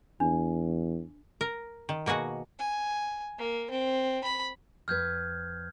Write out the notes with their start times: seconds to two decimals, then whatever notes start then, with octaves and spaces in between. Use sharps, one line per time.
0.20 E2 D4
1.41 A#4
1.89 D#3
2.06 B2 A#3 F#4 G#4 F#5
2.59 G#5
3.38 A#3
3.70 C4
4.24 B5
4.88 F2 B4 F6 G6 G#6